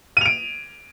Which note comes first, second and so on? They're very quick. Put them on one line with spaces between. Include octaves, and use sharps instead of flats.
D#7 F7 D7